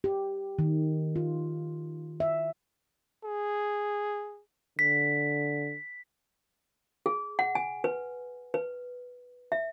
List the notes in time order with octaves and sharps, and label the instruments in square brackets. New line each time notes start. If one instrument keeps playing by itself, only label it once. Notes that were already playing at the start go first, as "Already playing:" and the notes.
[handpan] G4
D#3
F4
E5
[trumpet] G#4
[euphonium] D3 [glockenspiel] B6
[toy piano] G#4
F#5
G#5
B4
B4
E5